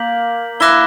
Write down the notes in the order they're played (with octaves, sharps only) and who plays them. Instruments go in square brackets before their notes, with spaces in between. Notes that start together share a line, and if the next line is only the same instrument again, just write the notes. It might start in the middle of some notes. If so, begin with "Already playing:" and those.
Already playing: [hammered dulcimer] A#3 [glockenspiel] G6 B6 F#7
[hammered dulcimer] E4 [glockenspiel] D6 F#6 A#6 E7 G7